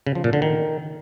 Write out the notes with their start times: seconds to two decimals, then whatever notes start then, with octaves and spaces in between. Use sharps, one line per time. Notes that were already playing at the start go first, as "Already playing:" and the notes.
0.07 C#3
0.15 F3
0.24 A#2
0.33 D3
0.42 D#3